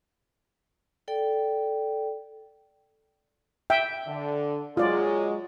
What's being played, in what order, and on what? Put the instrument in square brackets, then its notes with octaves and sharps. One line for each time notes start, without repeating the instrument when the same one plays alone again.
[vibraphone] A4 D5 G5
[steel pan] E5 G5
[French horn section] D3
[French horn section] F#3 G#3 [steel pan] F4 D5